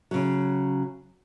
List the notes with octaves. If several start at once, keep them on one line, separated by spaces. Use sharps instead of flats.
C#3 F#3